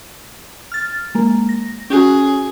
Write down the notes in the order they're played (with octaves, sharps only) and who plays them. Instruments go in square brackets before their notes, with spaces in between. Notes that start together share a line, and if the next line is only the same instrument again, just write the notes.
[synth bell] F6 A6
G#3 A#3
A#6
[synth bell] C#4 F#4 [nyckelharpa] G#4